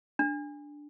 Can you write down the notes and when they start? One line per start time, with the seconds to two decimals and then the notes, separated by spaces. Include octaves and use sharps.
0.19 D4